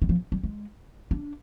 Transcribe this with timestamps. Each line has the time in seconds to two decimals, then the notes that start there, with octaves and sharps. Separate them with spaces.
0.02 D#3
0.09 F3
0.32 G3
0.43 G#3
1.11 D4